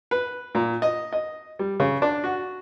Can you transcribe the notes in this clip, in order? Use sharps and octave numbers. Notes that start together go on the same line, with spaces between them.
B4
A#2
D#5
D#5
G3
C#3
D4
F#4